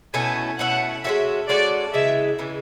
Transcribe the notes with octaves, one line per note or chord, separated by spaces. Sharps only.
B2 A3 C#4 E4 G#5
B2 A3 C#4 E4 F#5
G#3 C#4 F#4 A4 E5
G#3 C#4 F#4 A4 D5
C#3 E3 G#3 E5
C#3 E3 G#3